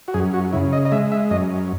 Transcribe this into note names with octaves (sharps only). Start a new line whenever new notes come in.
F#4
F#2 G#4
F#4
C#3 E4
D#5
D#5
G#3 E5
E5
F#2 D#5